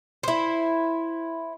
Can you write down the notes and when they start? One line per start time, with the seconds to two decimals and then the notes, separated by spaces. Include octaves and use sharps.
0.23 E4 C5